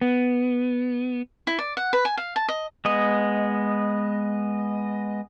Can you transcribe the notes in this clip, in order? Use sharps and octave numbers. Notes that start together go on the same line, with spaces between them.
B3
E4
D5
F#5
B4
G#5
F5
A5
D#5
G#3 B3 D#5